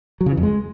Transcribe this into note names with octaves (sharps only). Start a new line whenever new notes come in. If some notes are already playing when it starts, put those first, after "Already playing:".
F#3
C#3
E3
F2
G#3